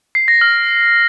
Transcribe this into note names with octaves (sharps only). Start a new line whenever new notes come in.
C7
A#6
F6